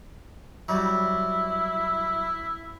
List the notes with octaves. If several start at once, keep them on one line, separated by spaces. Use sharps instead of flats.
F#3 G3 E4